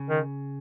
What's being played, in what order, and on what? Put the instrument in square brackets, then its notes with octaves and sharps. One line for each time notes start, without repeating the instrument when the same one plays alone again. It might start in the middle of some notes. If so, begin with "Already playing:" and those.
Already playing: [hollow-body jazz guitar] C#3
[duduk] D#3